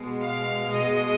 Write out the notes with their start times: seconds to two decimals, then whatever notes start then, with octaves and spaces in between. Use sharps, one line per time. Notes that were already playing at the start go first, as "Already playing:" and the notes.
Already playing: B2 G#3
0.20 F5
0.69 B2 G#3 D#5